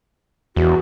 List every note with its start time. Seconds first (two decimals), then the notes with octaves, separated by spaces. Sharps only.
0.56 E2 F#4